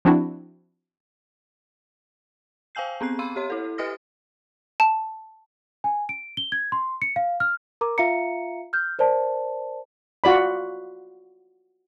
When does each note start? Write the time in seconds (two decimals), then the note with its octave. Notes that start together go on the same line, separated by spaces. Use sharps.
0.05 F3 C4 D4 E4 F#4
2.75 C5 F5 G5 G#5 G6 C7
3.01 B3 C4 F#6 C7
3.19 F5 B5 C6 E6 D#7
3.36 G4 C#5 C6
3.50 E4 A4
3.78 G4 B4 D#5 D#6 F6 A#6
4.80 A5
5.84 G#5
6.09 D7
6.37 G7
6.52 G#6
6.72 C6
7.02 C#7
7.16 F5
7.40 F6
7.81 A#4 A#5 D6
7.98 F4 E5 F5 A#5 C#7
8.73 F6 G6
8.99 A#4 C5 D5 A5
10.24 F4 F#4 D5 B5